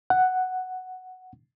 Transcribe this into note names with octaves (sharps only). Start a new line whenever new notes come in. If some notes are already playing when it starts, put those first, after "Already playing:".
F#5